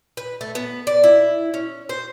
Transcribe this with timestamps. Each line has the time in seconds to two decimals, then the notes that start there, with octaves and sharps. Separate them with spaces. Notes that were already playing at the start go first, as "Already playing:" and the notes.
0.17 B4
0.41 A3
0.55 B3
0.87 D5
1.04 E4
1.54 C#4
1.89 C5